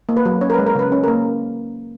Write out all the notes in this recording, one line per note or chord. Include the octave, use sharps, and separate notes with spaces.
A#3
B4
F#3
C#4 C#5
A#4
G#3 B4
A#4
C#3 B4
C#4
A#3 A#4